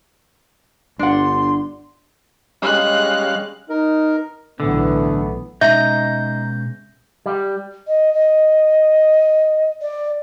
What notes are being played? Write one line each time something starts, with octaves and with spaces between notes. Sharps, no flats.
G1 D4 F#5 C6
G3 G#3 C#4 F5 F#6
D#4 A#4
B1 A2 D3 E3 A3 B3
B2 G#3 C#4 D#4 E5 G6 A#6
G3
D#5
D#5
D5